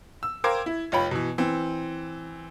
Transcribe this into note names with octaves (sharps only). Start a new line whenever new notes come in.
E6
A#4 C5 F5 G5 D6 G#6
E4
F1 F4 C#5 G5 B5
B2 E3
E3 C4